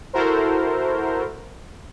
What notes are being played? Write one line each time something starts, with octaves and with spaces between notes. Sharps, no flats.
E4 F#4 A4 A#4 C5